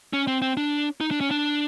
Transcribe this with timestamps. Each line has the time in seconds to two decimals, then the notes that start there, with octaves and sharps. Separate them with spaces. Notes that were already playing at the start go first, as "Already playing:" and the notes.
0.13 C#4
0.27 C4
0.42 C4
0.57 D4
1.01 D#4
1.11 D4
1.21 C#4
1.31 D4